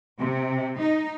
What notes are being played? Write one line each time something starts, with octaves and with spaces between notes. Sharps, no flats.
C3
D#4